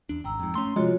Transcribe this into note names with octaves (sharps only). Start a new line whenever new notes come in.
E2 D4
G#1 G5 A#5 E6
F2 G#2
A3 C#4 C6
C3 F3 G#3 F4 F#4 C#5